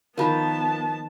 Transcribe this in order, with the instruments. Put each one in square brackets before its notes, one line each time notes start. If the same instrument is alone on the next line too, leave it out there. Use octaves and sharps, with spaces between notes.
[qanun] D#3 F3 [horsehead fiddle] B3 A5 [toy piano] F4 A#4